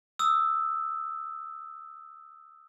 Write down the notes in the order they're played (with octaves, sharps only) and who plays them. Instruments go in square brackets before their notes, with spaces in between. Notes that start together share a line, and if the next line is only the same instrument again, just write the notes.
[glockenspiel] D#6 E6